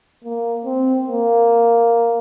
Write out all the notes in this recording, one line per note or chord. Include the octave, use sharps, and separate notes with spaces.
A#3
C4
A#3